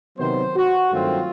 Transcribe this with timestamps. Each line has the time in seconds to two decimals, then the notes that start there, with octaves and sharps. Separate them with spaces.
0.17 C3 D#3 F#3 B3 C5
0.55 F#4
0.92 G2 D#3 F#3 A3 C4 F4